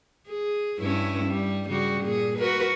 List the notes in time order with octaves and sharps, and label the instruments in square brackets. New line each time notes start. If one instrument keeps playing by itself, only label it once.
[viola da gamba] G#4
G2 C#4 E4
G3
C#3 G3 F#4
A#2 G#4
F#4 A#4 B4